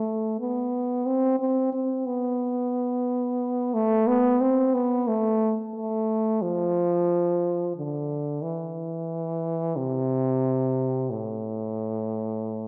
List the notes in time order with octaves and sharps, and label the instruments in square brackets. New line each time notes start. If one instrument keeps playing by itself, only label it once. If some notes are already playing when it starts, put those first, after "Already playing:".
Already playing: [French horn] A3
B3
C4
C4
C4
B3
A3
B3
C4
B3
A3
A3
F3
D3
E3
C3
A2